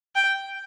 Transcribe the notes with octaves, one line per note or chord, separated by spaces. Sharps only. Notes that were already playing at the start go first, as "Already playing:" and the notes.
G5